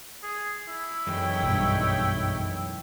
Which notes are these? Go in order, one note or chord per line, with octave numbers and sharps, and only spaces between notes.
G#4
E4
F#2 E3 G#3 D#4 C#5 G5
B1 G2